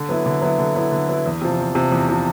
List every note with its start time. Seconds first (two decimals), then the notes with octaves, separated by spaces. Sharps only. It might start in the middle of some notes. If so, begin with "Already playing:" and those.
Already playing: D3
0.09 F#3 B3 E4
0.26 D3
0.41 F#3 B3 E4
0.58 D3
0.75 F#3 B3 E4
0.91 D3
1.08 F#3 B3 E4
1.26 E2
1.41 C3 F3
1.59 E2
1.75 C3 F3
1.92 E2
2.08 C3 F3